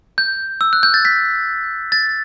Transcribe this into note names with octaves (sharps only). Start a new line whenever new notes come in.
G6
E6
F#6
G6
A6
B6
A6